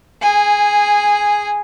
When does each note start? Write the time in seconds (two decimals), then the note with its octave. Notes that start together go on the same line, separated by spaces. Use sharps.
0.22 G#4 G#5